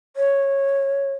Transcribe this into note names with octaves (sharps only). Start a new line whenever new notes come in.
C#5